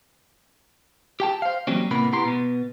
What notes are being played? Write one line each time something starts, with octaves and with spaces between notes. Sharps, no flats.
G4 G5 A5
C5 F5
E3 F#3 G3 A#3 C4 C#4
A2 C3 A#3 B3 B5
B3 E4 G4 A#5 C6
B2 B3